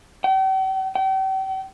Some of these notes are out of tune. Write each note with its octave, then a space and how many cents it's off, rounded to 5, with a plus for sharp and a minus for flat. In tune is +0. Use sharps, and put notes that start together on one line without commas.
G5 -45
G5 -40